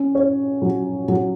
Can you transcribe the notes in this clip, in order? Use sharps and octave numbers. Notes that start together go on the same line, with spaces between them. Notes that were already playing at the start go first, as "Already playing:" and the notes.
Already playing: C#4
C#5
F#3
F#3